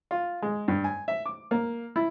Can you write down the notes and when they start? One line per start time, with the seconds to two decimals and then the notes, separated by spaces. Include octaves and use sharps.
0.11 F4
0.42 G#3
0.68 G2
0.84 G#5
1.08 E5
1.26 D6
1.51 A#3
1.96 E4